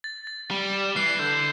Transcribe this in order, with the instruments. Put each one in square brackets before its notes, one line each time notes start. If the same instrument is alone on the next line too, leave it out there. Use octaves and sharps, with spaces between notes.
[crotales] A6
A6
[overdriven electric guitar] G3 [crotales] G7
[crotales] E7
[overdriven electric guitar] E3 [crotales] C7
[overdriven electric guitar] D3 [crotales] G6